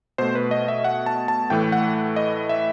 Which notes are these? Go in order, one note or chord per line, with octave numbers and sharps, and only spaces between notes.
B2 A3 C5
B4
D#5
E5
F#5
A5
A5
A2 E3 A3 G5
F#5
D#5
E5